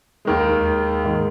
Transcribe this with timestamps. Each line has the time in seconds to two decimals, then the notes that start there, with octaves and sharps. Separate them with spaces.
0.25 D#2 D#3 G#3
1.04 G#2 D#3 G#3